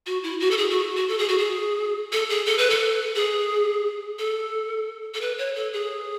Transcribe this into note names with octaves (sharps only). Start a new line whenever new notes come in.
F#4
E4
F#4
A4
G#4
F#4
F#4
A4
G#4
F#4
G#4
A4
G#4
A4
B4
A4
G#4
A4
A4
B4
C#5
A4
G#4